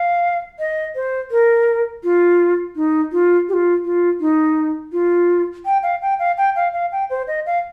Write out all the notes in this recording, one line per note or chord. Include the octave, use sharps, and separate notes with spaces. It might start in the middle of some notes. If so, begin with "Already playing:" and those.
Already playing: F5
D#5
C5
A#4
F4
D#4
F4
G4
F4
F4
D#4
F4
G5
F5
G5
F5
G5
F5
F5
G5
C5
D#5
F5